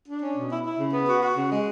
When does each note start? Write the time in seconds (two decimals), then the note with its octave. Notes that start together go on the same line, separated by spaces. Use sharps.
0.09 D4
0.23 C#4
0.37 B2
0.51 E4
0.65 E4
0.80 C#3
0.94 B3
1.09 F#4
1.22 F#4
1.37 C#3
1.52 G#3